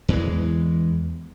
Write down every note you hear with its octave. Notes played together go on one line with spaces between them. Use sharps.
E2 E3 G#3